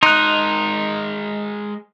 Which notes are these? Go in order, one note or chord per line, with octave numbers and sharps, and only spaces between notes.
G#3 D#4 A#4 C6 F#6